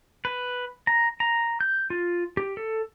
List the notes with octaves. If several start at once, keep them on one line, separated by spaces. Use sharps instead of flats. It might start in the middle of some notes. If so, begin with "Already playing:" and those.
B4
A#5
A#5
G6
F4
G4
A4